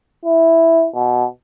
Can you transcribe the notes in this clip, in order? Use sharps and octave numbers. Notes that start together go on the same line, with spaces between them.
E4
B2